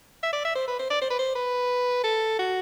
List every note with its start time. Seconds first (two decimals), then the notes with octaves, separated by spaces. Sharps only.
0.23 E5
0.32 D5
0.45 E5
0.55 C5
0.68 B4
0.79 C5
0.90 D5
1.02 C5
1.10 B4
1.19 C5
1.35 B4
2.04 A4
2.39 F#4